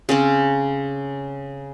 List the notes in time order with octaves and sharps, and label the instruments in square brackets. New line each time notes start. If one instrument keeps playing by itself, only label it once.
[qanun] C#3 C4 C#4